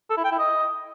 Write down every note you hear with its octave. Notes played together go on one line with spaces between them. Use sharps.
A4
E4
G5
E4
D#5